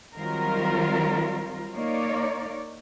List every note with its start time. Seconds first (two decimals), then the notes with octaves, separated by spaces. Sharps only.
0.16 D#3 F#3 G3 C4 F4 A#4
1.74 A#3 D#4 C#5 D5